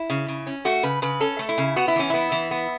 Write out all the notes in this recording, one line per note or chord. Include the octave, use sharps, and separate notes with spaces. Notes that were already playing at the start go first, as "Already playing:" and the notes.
Already playing: E4
C#3
C#3
C#4
A3 F#4
C#3 B4
C#3 B4
C#4 A4
A3
E4
C#3
B3 F#4
E4
E3 C#4
B3 E4
E3
B3